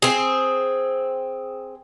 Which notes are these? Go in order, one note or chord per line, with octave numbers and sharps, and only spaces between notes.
C4 G#4